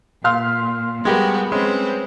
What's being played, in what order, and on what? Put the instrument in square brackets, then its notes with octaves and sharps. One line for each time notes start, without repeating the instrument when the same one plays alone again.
[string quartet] A#2 [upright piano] F5 C6 F6
[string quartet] G3 B3 F#4 [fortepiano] G#3 G4 A#4
[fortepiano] G#3 C#4 [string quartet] C4 B4